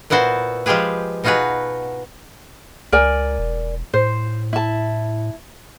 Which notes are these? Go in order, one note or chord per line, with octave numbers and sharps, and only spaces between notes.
A#2 B3 E4 F#4 C5
F3 G#3 F4 G4 G#4 B4
B2 D#4 F4 F#4 G#4 B4
C#2 A#4 D5 G#5
E1
A2 C5
E4 A5